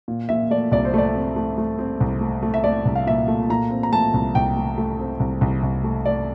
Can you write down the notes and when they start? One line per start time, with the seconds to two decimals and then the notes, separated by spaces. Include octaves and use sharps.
0.08 A#2
0.29 A#2 E5
0.51 A3 D5
0.72 C2 D5
0.85 C5
0.94 A3 D5
1.15 C4
1.36 A3
1.58 A3
1.79 C4
2.00 C2
2.21 A3
2.43 A3
2.54 E5
2.64 A3 D5
2.85 C2
2.96 F5
3.07 A#2 E5
3.28 A3
3.50 A#2 A#5
3.70 C4
3.83 A#5
3.92 A3 A5
4.14 C2
4.35 C2 G5
4.57 A3
4.78 A3
4.99 C4
5.20 C2
5.41 C2
5.63 C2
5.84 A3
6.05 A3 D5